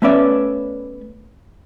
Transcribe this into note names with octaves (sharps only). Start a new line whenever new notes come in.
A3 B3 C#4 B4 D5 E5